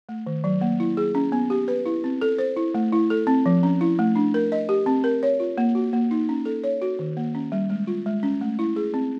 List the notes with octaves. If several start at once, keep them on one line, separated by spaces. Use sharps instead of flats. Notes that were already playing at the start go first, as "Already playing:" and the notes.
A3
D#3
F#3
A#3
E4
G#4
C#4
B3
G4
B4
E4
C4
A4
C5
E4
A3
E4
A4
C4
F3
C#4
E4
A3
D4
A#4
D#5
G4
C4
A#4
C#5
F4
A#3
F#4
A#3
D#4
C#4
A4
C#5
F#4
D#3
A#3
C#4
G3
G#3
F4
G#3
C#4
A3
E4
G#4
C4